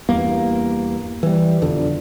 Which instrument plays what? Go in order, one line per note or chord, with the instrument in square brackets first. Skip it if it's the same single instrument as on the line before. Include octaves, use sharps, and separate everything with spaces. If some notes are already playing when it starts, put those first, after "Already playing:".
[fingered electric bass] E2 G2 A#3
E3 G3
E1 F2 D3